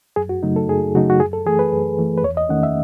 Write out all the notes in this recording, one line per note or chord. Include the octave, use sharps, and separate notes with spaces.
F#2 G#4
F#4
C#3 F#3 A3 D#4
A4
F#2 G#4
C#3 F#3 A3 D#4 F#4
F#4
F#2 G#4
A4
E3 A3 G#4
B4
F#2
E3 A3
B4
E2 C#5
D#5
D#3 A3 C#4 F#5
E5